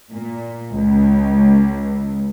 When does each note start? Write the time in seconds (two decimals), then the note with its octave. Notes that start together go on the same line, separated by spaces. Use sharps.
0.11 A#2
0.74 C#2